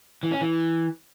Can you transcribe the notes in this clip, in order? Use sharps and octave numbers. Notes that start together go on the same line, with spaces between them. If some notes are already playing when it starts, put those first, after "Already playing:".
E3
C#4
E3